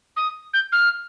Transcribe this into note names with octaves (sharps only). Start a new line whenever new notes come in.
D#6
G6
F6